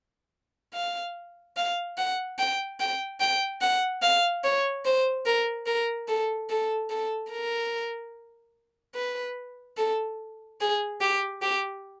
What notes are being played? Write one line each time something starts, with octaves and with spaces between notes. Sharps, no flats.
F5
F5
F#5
G5
G5
G5
F#5
F5
C#5
C5
A#4
A#4
A4
A4
A4
A#4
B4
A4
G#4
G4
G4